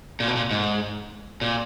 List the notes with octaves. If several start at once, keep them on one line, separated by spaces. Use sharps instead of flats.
A#2
B2
A#2
G#2
A#2